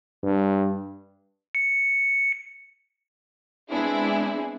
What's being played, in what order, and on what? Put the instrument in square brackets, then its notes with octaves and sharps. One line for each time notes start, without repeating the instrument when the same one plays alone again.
[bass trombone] G2
[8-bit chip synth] C#7
[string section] G#3 B3 C4 D4 E4 G#4